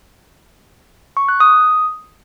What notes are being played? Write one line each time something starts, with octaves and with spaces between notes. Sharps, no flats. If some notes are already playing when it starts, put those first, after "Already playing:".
C#6
F#6
D#6